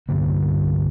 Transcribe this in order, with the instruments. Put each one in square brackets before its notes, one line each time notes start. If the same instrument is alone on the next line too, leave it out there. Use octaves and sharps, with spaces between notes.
[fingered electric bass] C2 G2 D3 A#3